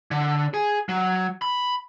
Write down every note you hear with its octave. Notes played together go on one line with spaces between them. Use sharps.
D3
G#4
F#3
B5